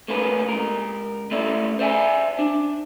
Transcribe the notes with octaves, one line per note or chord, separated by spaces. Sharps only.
A3 A#3 C#4 B4
C#2 A#4
A3 C#4 E4 A4 D5
C5 D5 E5 G5 G#5
D4